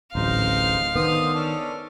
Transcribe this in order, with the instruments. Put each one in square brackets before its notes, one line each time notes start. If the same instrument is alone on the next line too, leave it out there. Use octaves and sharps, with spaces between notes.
[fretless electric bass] D1 A1 [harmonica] G#3 D#4 C5 [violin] F5
[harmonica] D3 C5 D#6 [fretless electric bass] D#3 B3
[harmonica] C#4 D4 A4